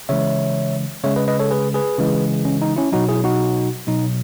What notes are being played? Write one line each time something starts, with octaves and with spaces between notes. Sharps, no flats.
C#3 E3 G#3 C#5 E5
C#3 G#3 C#5 E5
B4 D#5
B4 D#5
A4 C#5
G#4 B4
G#4 B4
C#3 E3 G#3
C#4
D#4
C#4 E4
B2 F#3 D#4 F#4
E4 G#4
D#4 F#4
B2 F#3 D#4